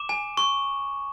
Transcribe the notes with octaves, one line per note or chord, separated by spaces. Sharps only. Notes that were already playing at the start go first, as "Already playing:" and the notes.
Already playing: D6 E7
G#5
C#6